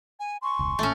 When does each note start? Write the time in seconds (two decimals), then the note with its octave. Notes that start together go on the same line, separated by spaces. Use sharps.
0.20 G#5
0.42 G#5 C6 C#6
0.59 E1 C#2
0.79 A1 A#2 A3 C#4